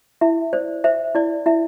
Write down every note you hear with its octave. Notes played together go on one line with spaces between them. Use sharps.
E4 E5
C5 D5
C5 E5
E4 D5
E4 E5